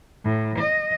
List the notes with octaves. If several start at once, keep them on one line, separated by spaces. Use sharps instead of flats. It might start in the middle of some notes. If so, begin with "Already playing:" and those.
A2
D#5